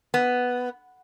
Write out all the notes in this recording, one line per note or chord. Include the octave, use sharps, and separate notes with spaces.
B3